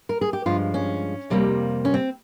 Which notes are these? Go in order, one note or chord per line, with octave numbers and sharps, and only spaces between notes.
A#4
G#4
G4
G2 F3 G#3 F4
C#4
F2 C3 G3 A#3
C#4
C4